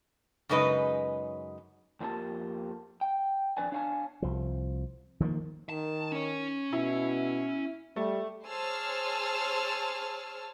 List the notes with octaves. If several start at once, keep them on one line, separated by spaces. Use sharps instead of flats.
F#2 C#3 G#3 D#4 B4 D#5
F2 F3 A#3 D4 G4 A5
G5
F2 G#2 D4 B4 D5 G#5
D4 C#5 F5 F#5 G#5 A5
C2 F3
D#3 F3 G#3 A#3
D#3 A5
C#4 C#5
B2 E4
G3 A3
G#4 C5 C#5 A5 E6 F6